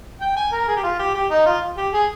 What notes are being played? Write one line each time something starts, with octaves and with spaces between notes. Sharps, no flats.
G5
G#5
A#4
G#4
G4
F4
G4
G4
D#4
F4
G4
G#4